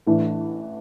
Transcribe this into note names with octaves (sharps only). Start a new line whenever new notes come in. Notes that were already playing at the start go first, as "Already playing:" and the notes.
A1 A2 E3 A3 D4